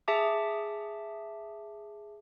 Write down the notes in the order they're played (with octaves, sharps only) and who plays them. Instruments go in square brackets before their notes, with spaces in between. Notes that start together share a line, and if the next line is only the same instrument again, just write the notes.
[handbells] G#4 E5 A5 D6